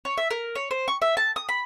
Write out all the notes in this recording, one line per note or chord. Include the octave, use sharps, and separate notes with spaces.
C#5
E5
A#4
C#5
C5
C#6
E5
A5
D#6
B5